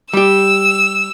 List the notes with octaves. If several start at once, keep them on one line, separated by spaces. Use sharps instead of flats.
G3 G4 E6